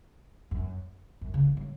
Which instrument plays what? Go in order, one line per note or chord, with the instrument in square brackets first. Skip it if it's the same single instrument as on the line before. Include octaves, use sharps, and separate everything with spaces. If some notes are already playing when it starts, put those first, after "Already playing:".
[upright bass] F#2
F#2
C#3
D#3
F#3